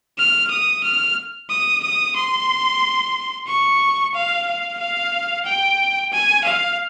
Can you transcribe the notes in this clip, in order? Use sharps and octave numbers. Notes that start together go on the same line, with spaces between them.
F6
D#6
F6
D#6
D#6
C6
C#6
F5
F5
F5
G5
G#5
F5